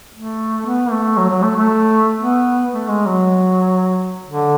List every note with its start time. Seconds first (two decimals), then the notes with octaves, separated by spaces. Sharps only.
0.15 A3
0.66 B3
0.91 A3
1.17 F#3
1.30 F#3
1.43 A3
1.57 A3
2.20 B3
2.72 A3
2.88 G#3
3.06 F#3
4.27 D3